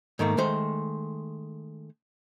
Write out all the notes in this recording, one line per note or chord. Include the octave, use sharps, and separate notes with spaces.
G#2 D#3 A3 A#3
D#3 G#3 A3 C5